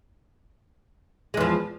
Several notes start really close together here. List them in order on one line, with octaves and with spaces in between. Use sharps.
G#3 E2 F3